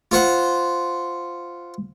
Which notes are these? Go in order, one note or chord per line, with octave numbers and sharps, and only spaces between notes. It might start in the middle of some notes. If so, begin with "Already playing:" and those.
F4 C5 F#5